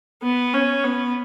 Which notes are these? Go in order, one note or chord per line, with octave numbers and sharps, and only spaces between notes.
B3
C#4
B3